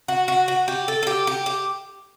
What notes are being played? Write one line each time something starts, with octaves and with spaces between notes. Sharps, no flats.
F#4
F#4
F#4
G4
A4
A4
G4
G4
G4